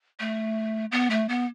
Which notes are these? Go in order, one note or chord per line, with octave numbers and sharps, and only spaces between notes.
A3
B3
A3
B3